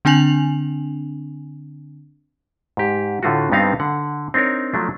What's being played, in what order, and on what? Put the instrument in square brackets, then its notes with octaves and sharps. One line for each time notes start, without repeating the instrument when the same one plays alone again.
[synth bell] D3 C4 D4 G#5 F7 F#7
[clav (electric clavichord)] G#2 G4
A2 D3 A3 F4 F#4
G2 G3 B3 C4 D#4 F5
D3 F#5
C4 D4 D#4 A#4 C#5
F3 F#3 A3 D4